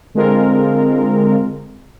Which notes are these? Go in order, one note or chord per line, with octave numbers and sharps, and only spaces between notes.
D3 G#3 C4 F4 A#4